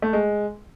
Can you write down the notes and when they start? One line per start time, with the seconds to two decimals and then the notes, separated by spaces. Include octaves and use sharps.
0.02 A3
0.13 G#3